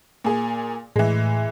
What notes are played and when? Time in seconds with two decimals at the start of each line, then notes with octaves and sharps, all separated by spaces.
0.24 A#2 G#4
0.96 A2 E3 G#3